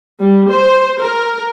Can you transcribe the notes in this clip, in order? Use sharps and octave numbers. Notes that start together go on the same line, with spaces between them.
G3
C5
A#4